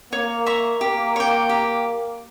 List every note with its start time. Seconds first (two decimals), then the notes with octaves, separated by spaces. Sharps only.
0.12 A#3 C#5
0.46 E5 A#5 C#6
0.81 A#3 G4
1.16 C#5 G5
1.49 G4